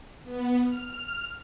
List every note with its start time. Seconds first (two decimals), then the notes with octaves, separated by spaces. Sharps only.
0.24 B3
0.63 F6